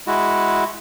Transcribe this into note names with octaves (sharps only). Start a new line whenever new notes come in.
G#3 E4 F#4